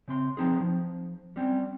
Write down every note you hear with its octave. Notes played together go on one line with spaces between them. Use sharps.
C#3 C4 C6
F3 C4 D#4 G#4
F3
G3 C4 C#4